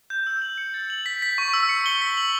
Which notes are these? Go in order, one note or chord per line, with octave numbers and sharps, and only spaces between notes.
G6
E6
F#7
C#7
A6
F#7
B6
B6
C#6
E6
C#7
G7
B6
F#7